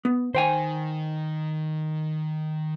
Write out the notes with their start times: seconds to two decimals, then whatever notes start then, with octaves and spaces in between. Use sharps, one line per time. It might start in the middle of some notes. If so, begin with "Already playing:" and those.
0.05 B3
0.35 D#3 C5 G5 G#5